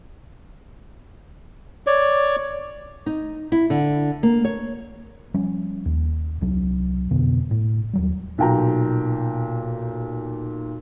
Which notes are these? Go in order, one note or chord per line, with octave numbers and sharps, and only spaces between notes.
C#5 D5
D#4
E4
D3
A#3
C#5
F3 G3 C#4
D#2
C2 F#3 D4
F2 B2 D3 B3
A2
D#2 F#3 G3
B1 A#2 G5 A#5